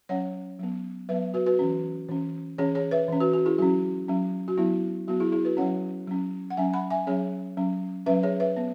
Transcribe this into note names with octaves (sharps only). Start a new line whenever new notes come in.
F#3 C#4 C#5 F#5
F#3 B3
F#3 B3 B4 E5
F#4 B4
F#4 B4
E3 C#4
E3 C#4
E3 C#4 G#4 C#5
G#4 C#5
B4 E5
E3 C#4
F#4 B4
F#4
E4 G#4
F#3 C#4 F#4
F#3 C#4
F#4
F#3 B3 E4
F#3 B3 F#4
E4 G#4
E4 G#4
F#4 B4
F#3 C#4 C#5 F#5
F#3 C#4
F#5
F#3 C#4 E5 G#5
F#5 B5
E5 G#5
F#3 C#4 G#4 C#5
F#3 C#4
F#3 C#4 B4 E5
G#4 C#5
B4 E5
B3